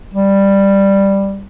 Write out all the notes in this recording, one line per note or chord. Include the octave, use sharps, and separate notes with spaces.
G3